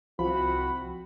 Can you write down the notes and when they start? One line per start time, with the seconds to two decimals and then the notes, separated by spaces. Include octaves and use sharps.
0.19 C2 F3 C4 E4 F#4 B5